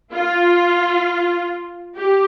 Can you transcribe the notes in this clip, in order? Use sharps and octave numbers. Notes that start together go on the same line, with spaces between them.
F4
G4